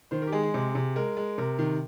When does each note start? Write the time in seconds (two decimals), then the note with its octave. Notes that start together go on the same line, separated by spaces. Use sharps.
0.11 D#3 C5
0.22 A#4
0.27 G4
0.32 G#3 G#4
0.43 G#4
0.54 C3
0.75 C3
0.96 G#3 A#4
1.17 G#3
1.38 C3 A#4
1.59 D#3